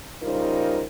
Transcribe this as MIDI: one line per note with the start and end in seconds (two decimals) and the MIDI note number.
0.23 0.83 49
0.23 0.83 55
0.23 0.83 63
0.23 0.83 65
0.23 0.83 70
0.23 0.83 72